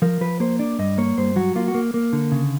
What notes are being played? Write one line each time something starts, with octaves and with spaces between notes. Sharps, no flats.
F3 A#4
F3 B4
A#3 C5
D4 D5
G2 D#5
A#3 C#5
G2 C5
F#3 F#4
A#3 F4
F#4
A#3
A#3
D3
C#3